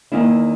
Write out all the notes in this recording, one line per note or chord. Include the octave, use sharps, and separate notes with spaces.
E2 D#3 A#3 E4